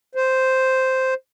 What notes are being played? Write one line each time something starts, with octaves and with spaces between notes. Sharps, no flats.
C5